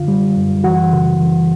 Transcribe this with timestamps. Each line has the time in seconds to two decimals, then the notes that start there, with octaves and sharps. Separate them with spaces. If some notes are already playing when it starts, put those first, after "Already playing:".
Already playing: F#2 D3 F4 F5
0.08 G3
0.36 F#2
0.64 E3 F#4 F#5
0.92 C#3
1.20 E3